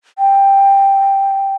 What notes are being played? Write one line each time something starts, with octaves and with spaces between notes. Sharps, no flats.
G5